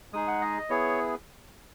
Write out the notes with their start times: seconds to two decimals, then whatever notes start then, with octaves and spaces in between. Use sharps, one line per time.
0.13 G#3 D#4 G#4 D#6
0.27 F#5
0.41 D#5
0.70 B3 E4 G#4 C#5